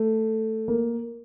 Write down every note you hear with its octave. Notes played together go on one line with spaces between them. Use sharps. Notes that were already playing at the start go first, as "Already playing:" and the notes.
Already playing: A3
A#3